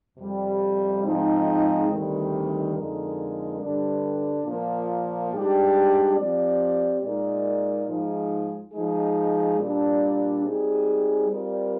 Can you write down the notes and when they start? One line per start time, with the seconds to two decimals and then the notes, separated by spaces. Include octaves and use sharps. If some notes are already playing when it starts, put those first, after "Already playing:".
0.17 F2 C3 G3
1.03 G#2 F3 G#3 C4 D#4
1.88 D2 C3 D#3 G3
2.73 F2 D3 G#3 D#4 A#4
3.59 G2 D3 G3 D4
4.44 A#2 F3 A#3
5.30 G#2 G3 D4 G4
6.15 F3 C4 G4 D5
7.01 A#2 G#3 D#4 A#4 D5
7.86 G#2 F3 G#3 D#4
8.72 F3 G#3 D#4 G#4
9.57 A#2 G3 D4
10.43 G3 C4 D#4 G#4
11.28 G3 C4 F4 A#4 D5